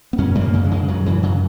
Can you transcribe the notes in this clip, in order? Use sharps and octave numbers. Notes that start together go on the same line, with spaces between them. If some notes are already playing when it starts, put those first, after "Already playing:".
B3
F#2 C#4
F#2
A#3
C#3
G#3
C#3
F#2 F#3
F#2 E3
C#3 F#3